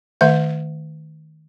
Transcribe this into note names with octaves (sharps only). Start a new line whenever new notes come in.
D#3 A3 E5